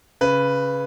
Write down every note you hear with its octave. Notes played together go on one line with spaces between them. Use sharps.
C#3 B4